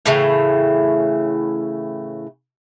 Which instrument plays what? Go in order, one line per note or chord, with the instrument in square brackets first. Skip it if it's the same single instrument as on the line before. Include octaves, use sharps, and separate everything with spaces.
[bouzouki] A2 C#3 E3